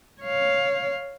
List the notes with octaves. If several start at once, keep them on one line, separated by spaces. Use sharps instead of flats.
C#5 F5